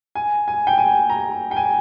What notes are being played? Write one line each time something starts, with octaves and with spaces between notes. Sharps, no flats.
G#5
G#5
G5
G#5
A#5
G5
G#5